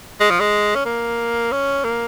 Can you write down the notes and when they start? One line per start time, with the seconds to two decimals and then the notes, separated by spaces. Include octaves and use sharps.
0.20 G#3
0.30 F3
0.40 G#3
0.75 C#4
0.86 A#3
1.52 C#4
1.84 A#3